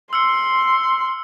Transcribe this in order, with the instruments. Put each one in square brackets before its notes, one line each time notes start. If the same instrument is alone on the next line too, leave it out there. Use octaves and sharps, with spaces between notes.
[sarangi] C6 [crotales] E6 F6 C#7